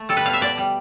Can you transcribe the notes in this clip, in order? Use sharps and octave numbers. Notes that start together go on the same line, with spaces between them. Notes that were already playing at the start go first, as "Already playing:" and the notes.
Already playing: A3
G3 A4
B4
B2 F5
E5
B2 D5
G3